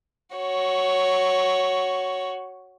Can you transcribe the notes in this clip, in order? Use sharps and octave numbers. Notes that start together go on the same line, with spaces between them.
F#4 C#5